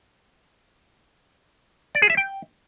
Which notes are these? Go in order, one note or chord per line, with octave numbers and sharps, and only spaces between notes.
D5
G#4
E5
G5